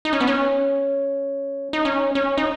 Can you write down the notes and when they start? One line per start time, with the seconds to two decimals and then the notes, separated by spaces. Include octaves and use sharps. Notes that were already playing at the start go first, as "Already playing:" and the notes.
0.05 D#4
0.13 C#4
0.20 B3
0.27 C#4
1.73 D#4
1.85 C#4
2.15 C#4
2.38 D#4